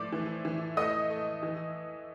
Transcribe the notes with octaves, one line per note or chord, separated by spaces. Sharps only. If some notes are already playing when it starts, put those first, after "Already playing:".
Already playing: A2 F3 D5 D6
E3
E3
A3 D#5 D#6
A3
E3